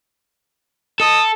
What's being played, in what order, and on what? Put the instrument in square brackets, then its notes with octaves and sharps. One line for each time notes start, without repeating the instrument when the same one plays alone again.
[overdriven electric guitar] A4 [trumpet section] D#5 D#6